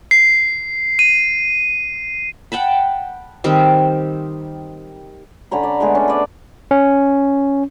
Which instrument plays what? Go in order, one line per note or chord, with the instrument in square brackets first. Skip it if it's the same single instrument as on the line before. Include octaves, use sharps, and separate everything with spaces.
[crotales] C7
D#7
[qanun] F#5 G5 A5 B5
D#3 G3 C4 G4
[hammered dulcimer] D3 C#4 A#5 B5
D5
G#3 A3 B3 G#4
C#4 D4
B4 D5
[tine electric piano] C#4